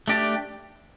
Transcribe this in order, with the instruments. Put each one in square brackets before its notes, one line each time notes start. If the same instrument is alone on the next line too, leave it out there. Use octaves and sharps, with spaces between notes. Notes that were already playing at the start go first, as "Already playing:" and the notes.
[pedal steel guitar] A3 D4 G4 D5